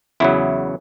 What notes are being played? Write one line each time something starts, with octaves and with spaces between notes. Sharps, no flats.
E2 C#3 F#3 E4